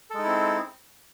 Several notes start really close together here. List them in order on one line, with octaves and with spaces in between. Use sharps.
A4 G#3 D#4 E4 C4